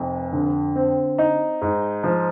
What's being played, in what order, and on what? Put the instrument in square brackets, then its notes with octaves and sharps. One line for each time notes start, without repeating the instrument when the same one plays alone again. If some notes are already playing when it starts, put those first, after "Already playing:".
Already playing: [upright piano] F1 F2
D3
C4
D#4
G#2
F3